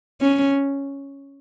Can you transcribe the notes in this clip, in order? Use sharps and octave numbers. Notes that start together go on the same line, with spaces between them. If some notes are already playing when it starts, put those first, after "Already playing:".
C#4